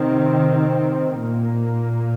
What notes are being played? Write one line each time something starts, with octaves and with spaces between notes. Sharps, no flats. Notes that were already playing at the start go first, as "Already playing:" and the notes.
Already playing: C3 D#3 C4
A#2 A#3